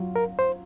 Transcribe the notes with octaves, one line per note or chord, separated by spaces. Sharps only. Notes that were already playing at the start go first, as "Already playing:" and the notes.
Already playing: F#3 F4
A#4
C5